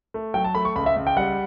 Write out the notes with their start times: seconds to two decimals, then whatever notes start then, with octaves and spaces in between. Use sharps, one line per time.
0.14 A3
0.34 F#3 G5
0.44 A5
0.55 A3 B5
0.65 C#6
0.76 C#2 B5
0.86 E5
0.96 C#2
1.07 G5
1.17 G3 F#5